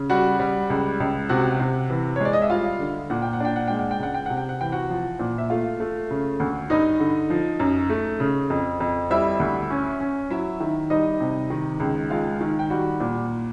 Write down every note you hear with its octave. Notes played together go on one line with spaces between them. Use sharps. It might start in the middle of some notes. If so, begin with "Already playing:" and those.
Already playing: C#3
G3 F#4 F#5
G3
C#2
C#2
C3 F#4 F#5
C3
E3
C#5
G#3 D5
D#5
E5
G3 F4 F5
D3
A#2 F#5
G5
F#5
D4 G5
F#5
G#3 G5
F#5
G5
C#2 F#5
G5
C3 F#5
G5
F#5
E3 G5
F#4 F#5
F3
A#2
E5
A3 F4 F5
A3
C#3
D2
G2 D#4 D#5
D3
F3
F#2
A3
C#3
F2
F2
G3 E4 E5
D2
C#4
C#4
F#3 E4 E5
D#3
G3 D#4 D#5
C3
D#3
C#2
G#3 F4 F5
D#3
G5
G3 F#4 F#5
A#2